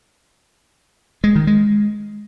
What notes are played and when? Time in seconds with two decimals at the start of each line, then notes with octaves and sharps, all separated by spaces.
1.24 G#3
1.35 D#3
1.47 G#3